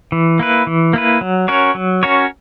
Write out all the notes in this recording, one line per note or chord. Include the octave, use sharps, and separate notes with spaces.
E3
A#3 E4 B4
E3
A#3 E4 B4
F#3
C#4 F#4 A#4 C#5
F#3
C#4 F#4 A#4 C#5